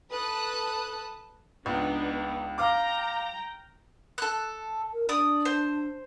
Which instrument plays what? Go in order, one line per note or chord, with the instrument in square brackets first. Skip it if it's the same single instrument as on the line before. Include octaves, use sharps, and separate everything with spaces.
[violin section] A4 B4 A5 D#6 F#6
[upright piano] C#2 [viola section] B3 D4 D#4
[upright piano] F5 D6 [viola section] G5 A#5
[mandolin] A4 F#6
[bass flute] A#4
[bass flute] D4 [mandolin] D5 D#6
[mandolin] C5